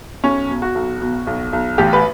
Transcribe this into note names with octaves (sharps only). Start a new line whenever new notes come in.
B1 C#4
B2
F#4
B1
B2
B1
B1
A1 G4
B4